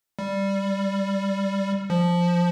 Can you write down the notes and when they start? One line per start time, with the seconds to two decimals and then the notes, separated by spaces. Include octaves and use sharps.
0.19 G3
1.90 F3